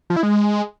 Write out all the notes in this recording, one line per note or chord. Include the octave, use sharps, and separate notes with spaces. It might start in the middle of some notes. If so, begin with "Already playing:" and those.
F3
E4
G#3